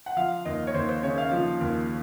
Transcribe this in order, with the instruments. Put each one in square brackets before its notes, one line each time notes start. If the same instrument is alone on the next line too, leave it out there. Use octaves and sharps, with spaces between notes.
[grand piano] F#5
F3 F5
D#2 D#5
C#5
D#2 C5
C5
C#3 C#5
F5
F3
D#2